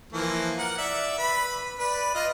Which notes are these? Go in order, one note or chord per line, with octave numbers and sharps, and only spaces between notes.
E3 F3 A#3
A#4 F#5
D5 E5
B4 B5
B4 D5
F4 D#5